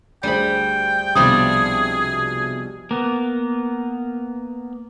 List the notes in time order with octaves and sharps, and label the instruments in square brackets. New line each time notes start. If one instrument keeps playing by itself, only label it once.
[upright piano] D2 G#4 C5 [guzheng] G3 B5 [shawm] G5
[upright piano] C2 B2 [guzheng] F3 G3 D4 [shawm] G#4 [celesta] D#6
[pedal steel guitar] A#3 B3